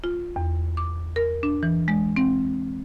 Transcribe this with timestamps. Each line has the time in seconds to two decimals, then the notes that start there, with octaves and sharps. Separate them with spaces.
0.04 F4
0.36 E2
0.77 D6
1.16 A#4
1.43 D4
1.63 E3
1.88 G#3
2.16 C4